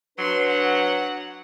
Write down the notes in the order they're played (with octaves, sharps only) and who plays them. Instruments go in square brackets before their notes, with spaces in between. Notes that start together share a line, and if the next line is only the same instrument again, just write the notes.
[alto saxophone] F#3 [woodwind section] D4 B4 [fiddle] C6
[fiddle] F#5